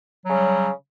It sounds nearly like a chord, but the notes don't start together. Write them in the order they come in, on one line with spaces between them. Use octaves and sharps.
F#3 C#3 G3